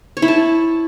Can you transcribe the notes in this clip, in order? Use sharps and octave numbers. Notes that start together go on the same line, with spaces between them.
C#5
E4
A5